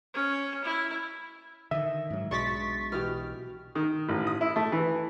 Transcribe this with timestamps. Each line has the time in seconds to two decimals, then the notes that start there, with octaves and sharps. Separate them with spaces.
0.14 C#4
0.65 E4
1.71 D3 D#3 D#5 E5
2.10 G#2 F#3
2.31 B1 B2 G#3 D4 C#6 A6 B6
2.92 B2 E3 G4 F6
3.75 D#3
4.09 A1
4.27 D#6
4.41 E4
4.56 A3
4.72 E3